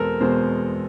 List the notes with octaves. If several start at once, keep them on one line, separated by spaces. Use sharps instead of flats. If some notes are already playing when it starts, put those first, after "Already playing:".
Already playing: E2 B2 G#3 C4 A4 A#4
E2 B2 G#3 C4 C5